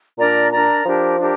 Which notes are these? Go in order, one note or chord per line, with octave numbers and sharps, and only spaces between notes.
A#2 D4 A#4 D5 A#5
D4 A#4 D5 A#5
F3 D4 G4 A#4
D4 G4 A#4